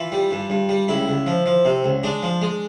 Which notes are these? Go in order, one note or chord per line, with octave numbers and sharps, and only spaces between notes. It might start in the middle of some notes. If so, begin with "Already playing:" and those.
Already playing: E3 F4
G3
G2
G2
G3
C#2 E4
C#2
F3
F3
C3
C#2
G#3 D4
F3
G#3